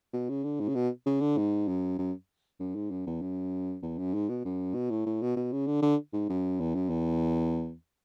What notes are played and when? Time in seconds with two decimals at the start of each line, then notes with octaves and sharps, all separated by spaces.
0.13 B2
0.29 C#3
0.44 D3
0.60 G#2
0.69 C#3
0.75 B2
1.06 C#3
1.21 D3
1.37 G#2
1.68 F#2
1.99 F#2
2.60 F#2
2.75 G#2
2.91 F#2
3.07 E2
3.22 F#2
3.83 E2
3.98 F#2
4.14 G#2
4.29 B2
4.45 F#2
4.75 B2
4.90 A2
5.06 A2
5.22 B2
5.36 B2
5.52 C#3
5.67 D3
5.82 D3
6.13 G#2
6.29 F#2
6.60 E2
6.75 F#2
6.90 E2